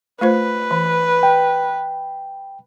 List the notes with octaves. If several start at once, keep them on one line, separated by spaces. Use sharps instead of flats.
A3 F4 B4 C5
E3
G5